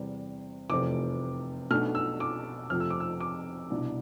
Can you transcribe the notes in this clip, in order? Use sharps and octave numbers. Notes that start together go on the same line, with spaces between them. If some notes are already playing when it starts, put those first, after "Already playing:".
Already playing: E2 C3 G3
F1 E2 C3 F3 A3 D6
B1 B2 A3 D4 F6
E6
D6
F2 C3 F3 A3 F6
E6
D6
E6
D6
C2 B2 B3 D4